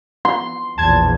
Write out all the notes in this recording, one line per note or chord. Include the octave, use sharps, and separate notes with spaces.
C6
A#1 E2 A5 G#6